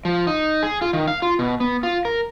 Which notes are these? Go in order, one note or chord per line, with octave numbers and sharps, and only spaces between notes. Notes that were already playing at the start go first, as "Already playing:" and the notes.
F3
D#4
G#4
F4
D#3
F5
F4
B2
B3
F4
A#4